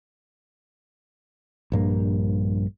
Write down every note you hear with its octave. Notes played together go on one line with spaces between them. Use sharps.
A#1 G2 A#3